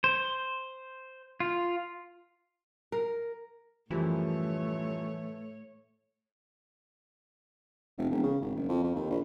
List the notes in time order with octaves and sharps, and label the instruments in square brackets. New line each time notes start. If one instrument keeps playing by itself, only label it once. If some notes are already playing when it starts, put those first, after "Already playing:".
[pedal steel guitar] C5
F4
[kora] A#4
[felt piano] F#2 F3 G3 [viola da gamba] A2 C#5 [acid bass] E3 [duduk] A3
[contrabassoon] F1
E1
C#3
G#1
F#1
F2
F2
D#2
A#1